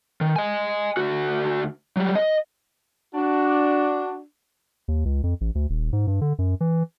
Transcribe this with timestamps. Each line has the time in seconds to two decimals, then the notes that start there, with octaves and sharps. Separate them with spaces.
0.21 D#3
0.36 D#5 G#5
0.97 D2 F#4
1.97 F#3 G3
2.15 D#5
3.15 D4 F#4
4.88 D#2
5.05 C#2
5.23 F2
5.41 A1
5.55 D2
5.70 D#1
5.93 G#2
6.07 G2
6.21 D3
6.39 F#2
6.61 E3